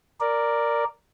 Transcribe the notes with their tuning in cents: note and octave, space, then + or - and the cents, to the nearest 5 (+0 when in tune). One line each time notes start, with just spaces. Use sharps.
A#4 +0 D5 +0